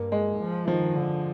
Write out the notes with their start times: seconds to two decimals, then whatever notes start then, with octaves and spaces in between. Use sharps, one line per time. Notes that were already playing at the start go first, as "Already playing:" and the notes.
Already playing: G2 A#3
0.12 G#3
0.39 F3
0.68 D#3 F3
0.96 D3